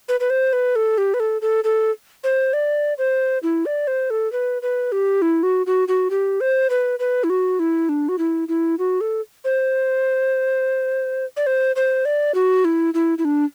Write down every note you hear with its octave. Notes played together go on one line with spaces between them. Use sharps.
B4
B4
C5
B4
A4
G4
B4
A4
A4
A4
C5
D5
C5
E4
D5
C5
A4
B4
B4
G4
E4
F#4
F#4
F#4
G4
C5
B4
B4
E4
F#4
E4
D4
F#4
E4
E4
F#4
A4
C5
D5
C5
C5
D5
F#4
E4
E4
E4
D4